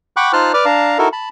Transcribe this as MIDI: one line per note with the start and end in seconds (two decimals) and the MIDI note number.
0.17 0.32 78
0.17 0.32 79
0.17 0.32 83
0.17 0.32 85
0.17 0.32 86
0.17 0.32 90
0.33 0.52 63
0.33 0.52 65
0.33 0.52 72
0.33 0.52 81
0.33 0.52 89
0.33 0.52 90
0.54 0.65 71
0.54 0.65 74
0.54 0.65 86
0.54 0.65 89
0.65 0.98 62
0.65 0.98 77
0.65 0.98 81
0.65 0.98 82
0.99 1.08 63
0.99 1.08 64
0.99 1.08 66
0.99 1.08 69
0.99 1.08 70
1.13 1.29 81
1.13 1.29 83